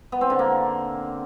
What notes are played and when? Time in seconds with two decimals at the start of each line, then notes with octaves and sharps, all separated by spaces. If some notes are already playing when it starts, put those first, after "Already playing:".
0.12 B3
0.21 C4
0.30 D3
0.39 A#3